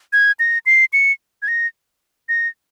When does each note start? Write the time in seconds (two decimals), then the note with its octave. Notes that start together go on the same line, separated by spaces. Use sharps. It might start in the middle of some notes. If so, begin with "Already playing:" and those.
0.13 G#6
0.39 A#6
0.66 C7
0.93 C#7
1.42 G#6
1.48 A#6
2.29 A#6